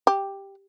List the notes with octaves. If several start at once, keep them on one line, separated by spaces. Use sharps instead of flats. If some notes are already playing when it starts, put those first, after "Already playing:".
G4